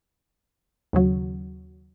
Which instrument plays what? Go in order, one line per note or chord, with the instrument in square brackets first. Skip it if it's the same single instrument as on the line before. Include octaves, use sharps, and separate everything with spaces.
[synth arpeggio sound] D#2 C#3 F#3